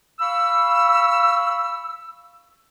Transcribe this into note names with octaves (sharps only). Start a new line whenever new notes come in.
F5 B5 C#6 E6